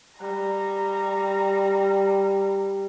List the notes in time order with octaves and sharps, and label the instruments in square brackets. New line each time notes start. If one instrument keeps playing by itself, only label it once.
[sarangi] G3 [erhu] A#5